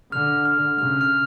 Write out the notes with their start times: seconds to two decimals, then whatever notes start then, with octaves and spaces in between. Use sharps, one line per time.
0.12 D3 F6
0.45 F6
0.78 C#3 F6
1.01 F6